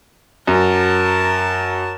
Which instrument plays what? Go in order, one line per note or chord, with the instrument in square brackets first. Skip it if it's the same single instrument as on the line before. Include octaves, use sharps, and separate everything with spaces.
[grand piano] F#2 [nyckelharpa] A#4 A5